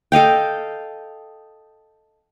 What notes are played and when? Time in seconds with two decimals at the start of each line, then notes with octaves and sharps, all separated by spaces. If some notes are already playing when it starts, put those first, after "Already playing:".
0.12 A4 D#5 F5 G5